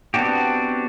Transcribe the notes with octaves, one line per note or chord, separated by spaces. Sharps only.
B3 C4 D4 F#4 G4